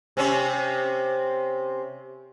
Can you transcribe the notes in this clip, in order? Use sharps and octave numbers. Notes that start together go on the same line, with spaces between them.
C3 C4 C#4